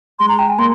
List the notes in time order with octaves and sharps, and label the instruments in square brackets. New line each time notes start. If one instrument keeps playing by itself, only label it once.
[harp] G#3 [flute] C6
[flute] A#5
G5
G#5
[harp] A#3 [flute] C6